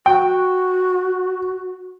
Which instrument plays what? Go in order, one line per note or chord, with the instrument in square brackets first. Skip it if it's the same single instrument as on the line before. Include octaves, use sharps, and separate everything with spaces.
[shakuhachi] F#4 [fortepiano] G5